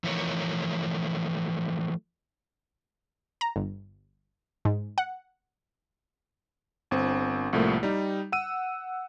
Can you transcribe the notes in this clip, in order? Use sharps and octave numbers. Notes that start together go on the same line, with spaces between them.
E3 F3 A3 A#4 C#5
A#5
G1
G#2
F#5
G1 C4
C2 A2 F3 A3 A#3
G3 D#4
F#5 E6 D#7